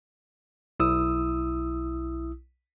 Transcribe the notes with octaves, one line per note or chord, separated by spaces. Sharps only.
B1 E4 D#6 E6